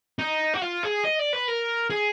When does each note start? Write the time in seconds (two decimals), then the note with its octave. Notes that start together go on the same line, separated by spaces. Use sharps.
0.19 D#4
0.54 F#4
0.62 F4
0.83 G#4
1.04 D#5
1.19 D5
1.33 B4
1.48 A#4
1.90 G#4